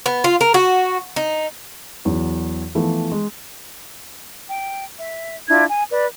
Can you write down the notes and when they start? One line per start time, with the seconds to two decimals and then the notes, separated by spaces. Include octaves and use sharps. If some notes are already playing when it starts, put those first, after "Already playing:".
0.06 B3
0.24 F4
0.41 A#4
0.54 F#4
1.16 D#4
2.05 E2 F#3
2.75 E3 F3 A3 B3
3.12 G#3
4.48 G5
4.99 E5
5.49 D4 E4 F4 G#6
5.69 G#5
5.92 B4 D5